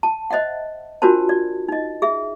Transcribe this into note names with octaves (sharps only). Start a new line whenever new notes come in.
A5
C5 D#5 E5 F#5
D4 F4 F#4 A#4 C5 A5
D5
D#4 D#5
G#4 E5